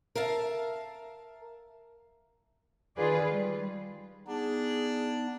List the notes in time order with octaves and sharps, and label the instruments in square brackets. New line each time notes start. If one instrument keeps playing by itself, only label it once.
[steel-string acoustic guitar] A#4 E5 F5 A5
[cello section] D#3 F4 G#4 B4 D5
G3
[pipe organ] B3 D#4 [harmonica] D4 [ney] G#4